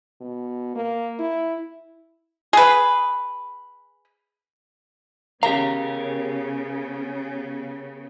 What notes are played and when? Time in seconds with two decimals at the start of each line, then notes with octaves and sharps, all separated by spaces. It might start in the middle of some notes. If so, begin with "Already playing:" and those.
0.21 B2
0.76 A#3
1.19 E4
2.53 G#4 B4
5.43 C#3 B3 G4 A#4 F5 A#5